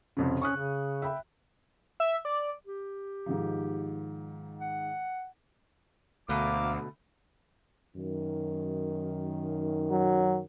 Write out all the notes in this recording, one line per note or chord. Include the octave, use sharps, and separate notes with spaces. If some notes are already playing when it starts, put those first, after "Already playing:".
C2 F2 C#3
C#4 C#6 D#6 F#6
C#3
E5 G5 B5
E5
D5
G4
G#2 D#3 F3
F#5
D2 B2 A3 A#3 D6 F6
F#2 D#3
F#3